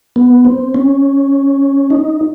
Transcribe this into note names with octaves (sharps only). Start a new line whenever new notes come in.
B3
C4
C#4
D#4